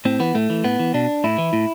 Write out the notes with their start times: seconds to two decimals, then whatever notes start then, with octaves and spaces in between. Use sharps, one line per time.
0.05 A2 C4
0.20 E3 B3
0.35 A2 A3
0.50 E3
0.64 A2 B3
0.79 E3
0.94 B2 D4
1.24 A2 E4
1.38 E3
1.53 A2